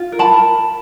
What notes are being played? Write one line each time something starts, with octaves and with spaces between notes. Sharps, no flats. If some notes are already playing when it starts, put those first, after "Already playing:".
Already playing: F4
A#4
A5 B5
A#4